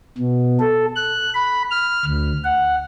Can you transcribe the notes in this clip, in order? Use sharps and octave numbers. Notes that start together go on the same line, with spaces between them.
B2
A4
F#6
B5
F6
D2
F#5